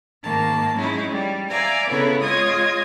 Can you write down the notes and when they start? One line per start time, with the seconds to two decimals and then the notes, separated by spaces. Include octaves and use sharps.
0.22 G#2 D#3 A#3 A5
0.74 F#3 G#3 C#4 D#4 E4
1.09 G3
1.48 D5 E5 F5 G#5 A#5
1.88 C#3 B3 E4 A4 B4 C#5
2.22 G#3 F4 C#5 D#5 D#6 G#6